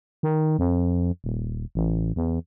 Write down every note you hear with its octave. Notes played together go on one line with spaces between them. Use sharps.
D#3
F2
D#1
A1
E2